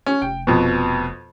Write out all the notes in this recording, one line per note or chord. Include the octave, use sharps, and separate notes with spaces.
C#4
F1 G5
F2 B2